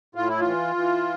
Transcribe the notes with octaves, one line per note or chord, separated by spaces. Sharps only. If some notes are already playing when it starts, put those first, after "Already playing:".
A2 F4
E4
E3 F4
E3